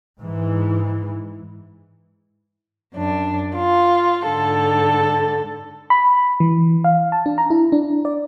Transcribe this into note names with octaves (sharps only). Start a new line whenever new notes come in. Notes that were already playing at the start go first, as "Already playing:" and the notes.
G#2 E3
F#2 D4
F4
G#2 D3 A4
B5
E3
F5
A5
D4
A#5
E4
D4
D5